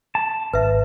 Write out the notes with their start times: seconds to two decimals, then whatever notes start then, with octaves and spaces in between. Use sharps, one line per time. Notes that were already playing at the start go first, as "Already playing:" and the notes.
0.15 A5
0.54 G#1 B4 E5